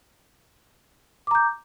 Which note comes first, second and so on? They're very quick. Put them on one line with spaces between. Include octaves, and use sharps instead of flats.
D6 A#5 G6